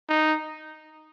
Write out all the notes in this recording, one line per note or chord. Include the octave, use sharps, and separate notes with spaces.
D#4